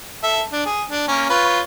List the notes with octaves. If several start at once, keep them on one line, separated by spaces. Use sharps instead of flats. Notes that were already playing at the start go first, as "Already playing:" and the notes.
A4 E5
D4
G#4
D4
A#3 C#4
F4 B4 C#5